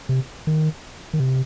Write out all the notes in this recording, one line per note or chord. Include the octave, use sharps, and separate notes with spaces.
C3
D#3
D#3
C3